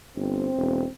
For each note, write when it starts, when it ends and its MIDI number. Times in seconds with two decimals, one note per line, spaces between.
0.16 0.48 31
0.16 0.89 60
0.57 0.83 28